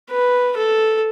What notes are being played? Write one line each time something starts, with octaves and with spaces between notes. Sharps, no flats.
B4
A4